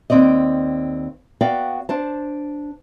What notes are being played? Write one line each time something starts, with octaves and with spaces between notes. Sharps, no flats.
D#2 C3 C4 D5 D#5
B3 F#4 D5 F5 G5
D4 C5 A5